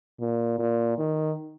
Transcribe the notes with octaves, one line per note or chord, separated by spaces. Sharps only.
A#2
A#2
D#3